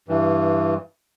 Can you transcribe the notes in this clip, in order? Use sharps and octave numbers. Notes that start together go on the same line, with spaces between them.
G2 E3